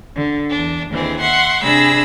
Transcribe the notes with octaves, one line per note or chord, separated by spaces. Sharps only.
D3
E2 D4
D#2 D3 E3 C4 G#4
E5 F#5 C6 C#6
C3 D4 G#4 B5 E6 A#6